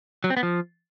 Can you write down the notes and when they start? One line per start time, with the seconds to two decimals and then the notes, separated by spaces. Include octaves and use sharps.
0.24 F#3
0.30 C4
0.37 B3
0.43 F3